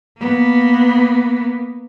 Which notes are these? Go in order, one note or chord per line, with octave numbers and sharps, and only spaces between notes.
A#3 B3